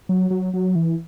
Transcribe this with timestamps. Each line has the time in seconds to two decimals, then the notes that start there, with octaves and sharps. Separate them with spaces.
0.09 F#3
0.30 F#3
0.54 F#3
0.75 E3